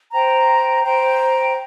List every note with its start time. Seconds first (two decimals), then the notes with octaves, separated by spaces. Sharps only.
0.12 C5 G5 A#5
0.82 C5 G5 A#5